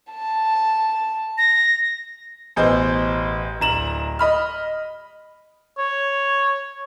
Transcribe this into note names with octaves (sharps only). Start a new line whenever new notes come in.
A5
A#6
A1 B2 G#4 C5 D#5 G6
D1 A#5 E7 F#7
D#5 B5 F6
C#5